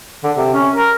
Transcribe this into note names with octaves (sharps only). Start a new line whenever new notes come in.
D3
C3
C#4
A#4